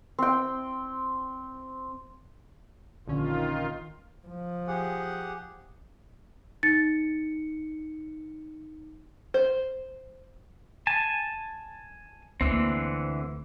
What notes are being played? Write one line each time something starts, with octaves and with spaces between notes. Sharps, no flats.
C4 G5
A#1 D3 D#3 C#4 F4
F3
G4 G#4 F#5
D#4 A6 C#7
C5
G#5 A5
D2 D3 E3 A#3 C4